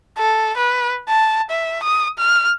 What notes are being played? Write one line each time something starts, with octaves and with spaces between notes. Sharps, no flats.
A4
B4
A5
E5
D#6
F6